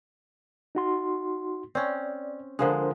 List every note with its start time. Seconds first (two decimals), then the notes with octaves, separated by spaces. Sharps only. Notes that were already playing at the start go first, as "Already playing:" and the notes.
0.75 D#4 F#4 C6
1.75 C4 C#4 D5
2.59 D3 F3 G#3 D4 A#4 C5